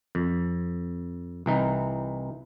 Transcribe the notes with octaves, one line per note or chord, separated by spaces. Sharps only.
F2
C2 E3 D#4